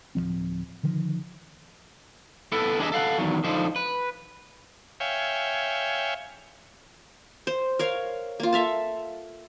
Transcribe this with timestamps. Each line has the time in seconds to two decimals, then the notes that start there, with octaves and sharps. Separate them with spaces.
0.15 D1 D#2 F3 C4
0.83 D3 D#3 F3
2.52 B3 E4 A4
2.79 E2 D4 G#4 C5 D#5 E5
2.92 A4 F5 F#5
3.18 E2 D#3 F#3
3.44 D3 F3 D#4 C5
3.76 B4
5.00 C#5 E5 F5 G5 G#5
7.47 C5
7.79 A#4 C#5 F5
8.40 A#3 F4
8.53 A4 E5 F5 A5